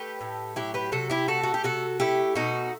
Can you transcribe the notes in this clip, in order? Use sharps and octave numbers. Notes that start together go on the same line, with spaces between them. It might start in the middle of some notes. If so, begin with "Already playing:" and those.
Already playing: A3 G4 B4
A2
F#3 E4 G4
G4 B4
C3 F#4 A4
E4 G4
A3 F#4 A4
F#4
G4
C3 F#4 A4
A3 E4 G4
B2 D#4 F#4